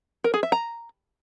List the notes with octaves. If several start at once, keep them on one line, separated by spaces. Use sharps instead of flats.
A#4
G#4
E5
A#5